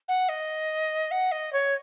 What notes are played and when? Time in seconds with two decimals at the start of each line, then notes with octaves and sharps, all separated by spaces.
0.08 F#5
0.29 D#5
1.11 F#5
1.32 D#5
1.53 C#5